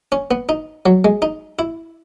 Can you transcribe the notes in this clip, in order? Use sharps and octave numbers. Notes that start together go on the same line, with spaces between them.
C#4
B3
D#4
F#3
G#3
D#4
E4